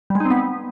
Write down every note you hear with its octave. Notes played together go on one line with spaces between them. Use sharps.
G3
G#3
D#4
C4
B3